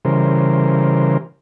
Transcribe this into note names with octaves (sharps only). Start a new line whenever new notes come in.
C#3 E3 G3 A#4 C5